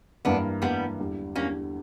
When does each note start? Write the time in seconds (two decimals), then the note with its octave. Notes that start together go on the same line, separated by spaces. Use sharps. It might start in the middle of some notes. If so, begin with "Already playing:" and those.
0.25 G2 E3 A#3 B3 D4
0.62 G2 E3 G3 A#3 B3
0.99 E2 D3 G3
1.35 E2 D3 G3 A#3 C#4